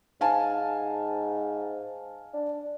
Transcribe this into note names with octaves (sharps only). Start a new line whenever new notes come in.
G#2 F5 G#5 A5
D4